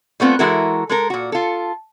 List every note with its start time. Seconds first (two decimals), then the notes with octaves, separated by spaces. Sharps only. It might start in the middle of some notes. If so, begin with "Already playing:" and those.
0.20 G3 A3 B3 C4 F4
0.39 E3 G#3 E4 F#4 A4 A#4
0.89 G#3 A4 A#4
1.10 A#2 F#4
1.32 F4 A4